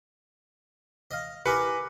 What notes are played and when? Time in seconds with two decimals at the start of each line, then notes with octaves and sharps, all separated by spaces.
1.11 D#5 F5
1.46 E4 G4 A#4 B4 G#5 A#5 D6 C#7